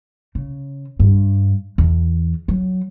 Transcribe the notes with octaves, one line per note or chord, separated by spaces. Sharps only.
C#3
G2
E2
F#3